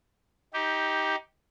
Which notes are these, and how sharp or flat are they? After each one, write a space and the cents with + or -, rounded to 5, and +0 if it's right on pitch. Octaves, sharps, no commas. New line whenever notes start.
D#4 +20 G4 +0